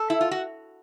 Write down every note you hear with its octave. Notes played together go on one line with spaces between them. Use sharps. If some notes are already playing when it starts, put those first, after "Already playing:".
Already playing: A4
E4
F4
F#4